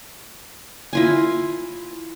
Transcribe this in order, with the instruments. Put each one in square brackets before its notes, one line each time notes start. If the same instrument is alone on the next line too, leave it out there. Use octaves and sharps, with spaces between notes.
[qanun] E4 F4 G#5